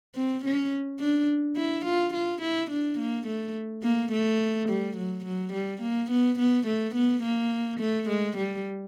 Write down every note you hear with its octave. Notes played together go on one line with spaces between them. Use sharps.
C4
C#4
D4
E4
F4
F4
E4
D4
A#3
A3
A#3
A3
G3
F#3
F#3
G3
A#3
B3
B3
A3
B3
A#3
A3
G#3
G3